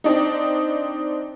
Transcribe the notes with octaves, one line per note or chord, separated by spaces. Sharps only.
C4 D4 D#4